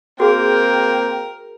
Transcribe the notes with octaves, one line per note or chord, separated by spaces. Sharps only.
A#3 C4 F#4 G#4 A#4 G5